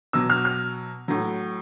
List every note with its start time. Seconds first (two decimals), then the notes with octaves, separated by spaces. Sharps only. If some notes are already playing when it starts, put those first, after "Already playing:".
0.13 B2 F#3 E6
0.30 F6
0.45 F6
1.08 A2 F#3